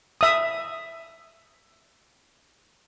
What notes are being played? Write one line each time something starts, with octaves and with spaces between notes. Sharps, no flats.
E5 D#6